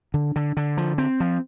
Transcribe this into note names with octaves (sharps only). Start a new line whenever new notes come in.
D3
D3
D3
F3
C4
F3